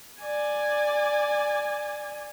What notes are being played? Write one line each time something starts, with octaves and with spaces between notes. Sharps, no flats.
D5 G#5